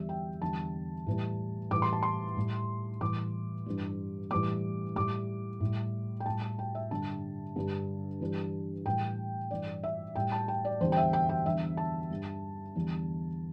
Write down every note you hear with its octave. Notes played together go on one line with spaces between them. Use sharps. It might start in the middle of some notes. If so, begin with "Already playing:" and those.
Already playing: E2 D3 G3 E5
G5
E2 D3 G3 A5
A2 E3 G3
A2 E3 G3 D6
C6
A5
C6
A2 G3
A2 E3 G3 D6
G2 E3 G3
A2 E3 G3 D6
A2 G3 D6
A2 G3
G5
A2 G3 A5
A5
G5
E5
G2 D3 G3 A5
G2 D3 G3
G2 E3 G3
A2 E3 G3 G5
G2 E3 G3 D5
E5
A2 G3 G5
A5
G5
D5
E2 D3 G3 C5
G5
E5
G5
G5
E2 D3 G3 E5
A5
G2 G3
E2 D3 G3